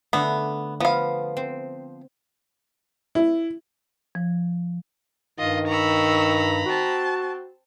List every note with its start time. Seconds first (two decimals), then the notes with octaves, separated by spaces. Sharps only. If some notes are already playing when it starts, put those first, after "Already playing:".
0.13 D3 A3 B3
0.80 F3 B3 F5
1.37 C4
3.15 E4
4.15 F3
5.39 G2 D#3 F4 D#5
5.68 A#5 B5 C#6 E6
6.66 C4 F#4 A5